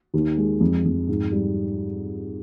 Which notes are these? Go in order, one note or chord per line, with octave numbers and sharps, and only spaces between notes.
D#2
G#3
F2
F2
G#2
G3